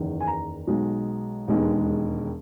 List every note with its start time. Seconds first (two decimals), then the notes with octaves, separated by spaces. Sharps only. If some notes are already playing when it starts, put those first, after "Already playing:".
Already playing: F#1 E2 D#3
0.20 G#5
0.27 A#5
0.67 B1 B2 G#3
1.48 E1 D#2 D#3 G#3 B3